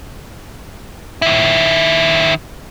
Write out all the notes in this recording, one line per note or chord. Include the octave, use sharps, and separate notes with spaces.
D#3 E4